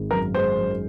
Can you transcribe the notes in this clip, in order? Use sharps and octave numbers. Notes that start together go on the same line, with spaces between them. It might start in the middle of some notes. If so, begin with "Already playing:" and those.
Already playing: G#1 G#3
F#2 A#4
G#3 C5
F#2